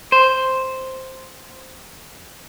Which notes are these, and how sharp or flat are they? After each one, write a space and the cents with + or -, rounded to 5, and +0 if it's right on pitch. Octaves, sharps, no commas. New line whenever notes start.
C5 +0